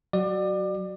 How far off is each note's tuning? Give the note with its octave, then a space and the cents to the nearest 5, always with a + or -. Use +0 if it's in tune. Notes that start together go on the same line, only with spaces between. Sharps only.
F#3 +5 F#4 +15 D5 +25